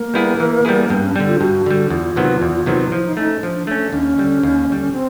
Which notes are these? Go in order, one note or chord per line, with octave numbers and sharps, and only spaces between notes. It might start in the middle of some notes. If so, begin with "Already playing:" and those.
Already playing: A#3
G3 B3 E4 G#4
E3
G3 B3 E4 G#4
G2 B3
C#4
D3 G3 B3
F4
G2 F#4
D3 G3
E2 F4
C3 D#3 F#3 B3
E2
C3 D#3 F#3 B3
F3 E4
D#4
A3 C#4 D#4
F3 D4
D4
A3 C#4 D4
D4
D#2 C#4
D3 G3
D#2
D3 G3
C4